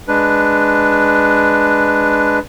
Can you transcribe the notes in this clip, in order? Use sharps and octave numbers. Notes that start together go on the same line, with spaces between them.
G#3 D4 B4